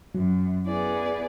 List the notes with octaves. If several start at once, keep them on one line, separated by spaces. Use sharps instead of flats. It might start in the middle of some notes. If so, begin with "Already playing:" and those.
F#2 F#3
B3 E4 G#4 D5